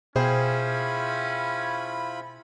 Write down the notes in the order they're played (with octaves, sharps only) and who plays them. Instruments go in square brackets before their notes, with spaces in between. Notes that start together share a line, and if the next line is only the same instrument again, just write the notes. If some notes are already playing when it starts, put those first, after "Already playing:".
[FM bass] B2 [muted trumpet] C#4 [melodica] E4 F4 B5 [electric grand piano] G#4 C5 G5